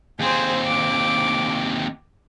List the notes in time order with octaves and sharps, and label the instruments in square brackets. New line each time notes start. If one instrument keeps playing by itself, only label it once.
[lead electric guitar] D#2 C4 [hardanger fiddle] G#4 C5
[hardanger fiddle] D6